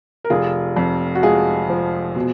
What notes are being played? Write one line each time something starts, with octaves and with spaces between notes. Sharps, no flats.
A#4
F1 F4 G#4
F2
F#4
G#3 F4 G#4
F3
B2